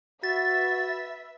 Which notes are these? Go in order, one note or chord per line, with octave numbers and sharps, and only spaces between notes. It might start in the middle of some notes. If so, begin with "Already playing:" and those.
F#4 B4 E5 A6